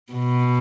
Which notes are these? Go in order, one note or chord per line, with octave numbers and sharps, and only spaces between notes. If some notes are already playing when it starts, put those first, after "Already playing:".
B2